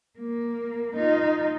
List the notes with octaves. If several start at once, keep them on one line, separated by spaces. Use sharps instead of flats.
A#3
D#4 F4